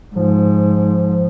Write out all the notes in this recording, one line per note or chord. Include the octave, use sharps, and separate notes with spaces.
G#2 F3